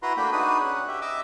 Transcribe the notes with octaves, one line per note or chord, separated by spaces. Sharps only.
E4 F#4 B4 A#5 C6
A3 A#3 D4 F#4 G5 B5
D4 D#4 F#4 G#4 B4 D#6
C#4 F#5
G4 E5
D#5 E5 D6 E6